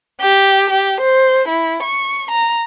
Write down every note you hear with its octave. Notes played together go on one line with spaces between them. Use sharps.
G4
G4
C5
E4
C#6
A#5